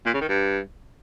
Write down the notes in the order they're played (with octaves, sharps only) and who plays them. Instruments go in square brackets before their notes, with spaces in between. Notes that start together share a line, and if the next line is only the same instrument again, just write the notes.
[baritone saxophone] A#2
C#3
D#3
G2